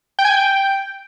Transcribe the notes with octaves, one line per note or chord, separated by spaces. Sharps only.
G5
G#5
G5